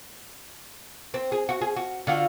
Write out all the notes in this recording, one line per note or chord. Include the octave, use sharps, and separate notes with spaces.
C4
G#4
F#4
G#4
F#4
D3 F4 F#4